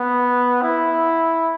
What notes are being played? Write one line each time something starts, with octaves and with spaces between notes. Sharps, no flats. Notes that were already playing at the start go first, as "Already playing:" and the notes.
Already playing: B3
E4